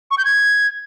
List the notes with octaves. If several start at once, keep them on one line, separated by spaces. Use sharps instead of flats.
C#6
G6
G#6